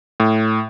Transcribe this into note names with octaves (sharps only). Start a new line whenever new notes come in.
A2